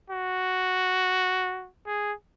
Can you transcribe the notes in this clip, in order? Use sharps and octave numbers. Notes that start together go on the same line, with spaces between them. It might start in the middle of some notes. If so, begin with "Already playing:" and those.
F#4
G#4